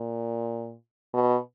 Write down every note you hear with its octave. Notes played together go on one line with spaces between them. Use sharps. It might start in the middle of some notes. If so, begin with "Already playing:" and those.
Already playing: A#2
B2